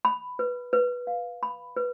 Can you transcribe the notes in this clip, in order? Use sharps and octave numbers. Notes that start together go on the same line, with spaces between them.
B5
B4
B4
F5
B5
B4